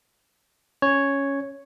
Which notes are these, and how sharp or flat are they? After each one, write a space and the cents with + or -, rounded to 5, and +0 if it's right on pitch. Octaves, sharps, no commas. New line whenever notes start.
C#4 +0 C#5 +0